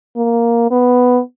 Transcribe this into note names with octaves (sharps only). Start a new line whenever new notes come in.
A#3
B3